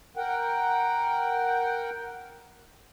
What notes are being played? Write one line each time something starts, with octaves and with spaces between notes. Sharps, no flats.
A#4 F#5 G5